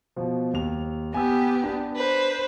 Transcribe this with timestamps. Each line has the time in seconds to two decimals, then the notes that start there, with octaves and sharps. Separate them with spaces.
0.16 B2 F3
0.53 D#2 F7
1.14 B3 G4 G#5 E6
1.64 D4
1.97 B4 C5